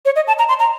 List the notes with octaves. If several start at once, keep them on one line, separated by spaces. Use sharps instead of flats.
C#5
D#5
A5
A#5
C6
A#5